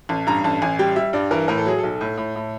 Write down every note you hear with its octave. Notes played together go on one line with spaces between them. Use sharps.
A1 A5
G2 A#5
A1 A5
A1 G#5
G3 G5
G3 E5
G2 D5
E3 A#4
A2 A#4
A4
F#3 G#4
A4
B1
A2
A2
A2